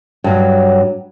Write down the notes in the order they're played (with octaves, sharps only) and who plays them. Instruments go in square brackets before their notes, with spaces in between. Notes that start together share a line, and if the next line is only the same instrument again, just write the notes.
[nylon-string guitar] G2 F#3